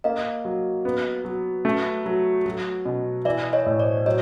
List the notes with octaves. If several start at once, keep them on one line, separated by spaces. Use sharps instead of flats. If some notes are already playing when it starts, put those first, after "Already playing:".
A#3 D#5 F5
F#3
B3
F#3
A3
F#3
F#3
B2
E3 D5 E5
C#5 D#5
A2
C5 D5
F#3 C#5 D#5